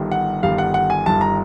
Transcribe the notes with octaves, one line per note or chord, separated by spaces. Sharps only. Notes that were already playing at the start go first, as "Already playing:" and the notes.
Already playing: G1 G2 D#3 G3
F#5
G1 G2 D#3 G3 F5
F#5
F#5
G#5
G1 G2 D#3 G3 A5
A#5